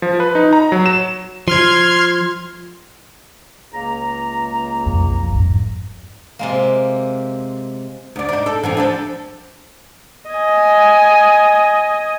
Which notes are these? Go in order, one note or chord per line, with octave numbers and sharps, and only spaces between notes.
F3
B4
D#4
A#5
F#3
E7
F3 C6 F6 G#6
C#2 A#3 A#5
B1 F2
F2 G#2
C3 G#3 A#3
D2 D5
D4 D#4
A4
E3 C4 D4
F3 D4 A4
D#5 G#5